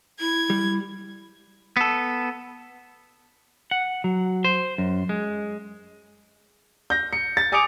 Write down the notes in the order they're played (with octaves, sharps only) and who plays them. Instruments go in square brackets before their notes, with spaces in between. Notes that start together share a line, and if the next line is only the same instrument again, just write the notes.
[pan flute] E4 [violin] G#6
[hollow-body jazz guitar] G3
[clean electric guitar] B3 A4
F#5
F#3
C5
F#2
G#3
[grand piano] G6 A#6
C#7
A6
G#5 D6 D#6 C#7 D7 F7